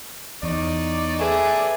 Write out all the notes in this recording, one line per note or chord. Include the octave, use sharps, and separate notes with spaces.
E2 D#4 C#5 D5
A3 G#4 A4 B4 D5 E5